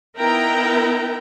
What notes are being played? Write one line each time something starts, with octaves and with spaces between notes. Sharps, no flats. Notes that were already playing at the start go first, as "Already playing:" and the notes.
B3 D#4 E4 A#4 G5 A#5